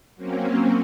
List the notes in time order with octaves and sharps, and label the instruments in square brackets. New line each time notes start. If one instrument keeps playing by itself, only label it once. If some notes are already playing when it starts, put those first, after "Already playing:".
[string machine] F#3 A#3 C4 C#4